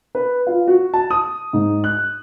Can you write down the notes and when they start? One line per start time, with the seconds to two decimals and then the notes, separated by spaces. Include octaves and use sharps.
0.15 B4
0.47 F4
0.67 F#4
0.94 A5
1.10 D#6
1.53 G#2
1.84 F#6